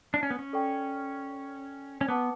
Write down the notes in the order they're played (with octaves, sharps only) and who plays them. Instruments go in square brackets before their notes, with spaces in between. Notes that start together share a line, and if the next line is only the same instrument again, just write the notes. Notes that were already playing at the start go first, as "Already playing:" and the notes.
[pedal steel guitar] D4
C#4
B3
C#4
[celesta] A4 D5 G5 C#6
[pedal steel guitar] C#4
[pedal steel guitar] B3 [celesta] B4 F#5 A5 D6